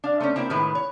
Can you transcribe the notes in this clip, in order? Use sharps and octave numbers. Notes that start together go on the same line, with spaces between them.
D4 F5
A3 C4 C#4
A#3 C4 E4 A#4 G5
A2 D#3 G#3 E4 B4
C#5